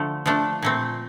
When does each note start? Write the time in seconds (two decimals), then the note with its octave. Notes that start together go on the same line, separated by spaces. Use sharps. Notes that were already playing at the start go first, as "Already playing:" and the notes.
Already playing: D3 F3 A3
0.26 F3 A3 D4
0.63 A#2 A3 C4